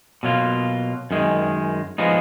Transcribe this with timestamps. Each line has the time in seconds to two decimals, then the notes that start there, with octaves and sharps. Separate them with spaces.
0.23 B2 F#3 A#3 F4
1.11 F#2 D#3 G#3
1.98 F3 G#3 B3 D#4